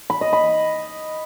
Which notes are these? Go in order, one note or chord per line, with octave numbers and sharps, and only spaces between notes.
B5
D#5
B5